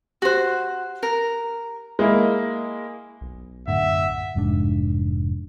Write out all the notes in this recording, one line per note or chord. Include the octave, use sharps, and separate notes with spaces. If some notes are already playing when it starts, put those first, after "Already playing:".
F#4 G4 C5 F#6
A#4
G#3 A#3 E4
B1
F#2 A2 D3 E5 F#5
F1 G#2 B2 D4